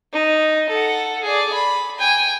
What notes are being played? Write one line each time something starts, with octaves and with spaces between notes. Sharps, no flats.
D#4
A4 F#5
G#4 D5
B5
G5 G#5